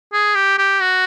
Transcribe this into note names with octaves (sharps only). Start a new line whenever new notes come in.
G#4
G4
G4
F#4